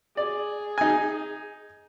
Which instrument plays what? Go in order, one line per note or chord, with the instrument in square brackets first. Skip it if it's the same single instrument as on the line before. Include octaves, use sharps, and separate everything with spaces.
[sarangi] G#4 [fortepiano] D5
[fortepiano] D#4 G#5